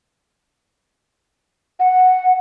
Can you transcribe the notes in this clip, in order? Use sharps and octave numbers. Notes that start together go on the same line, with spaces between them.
F#5